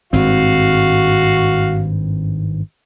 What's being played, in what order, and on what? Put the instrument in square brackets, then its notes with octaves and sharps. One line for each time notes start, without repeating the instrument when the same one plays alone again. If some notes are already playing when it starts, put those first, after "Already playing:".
[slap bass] G#1 G2 C4 [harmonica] F#4 F5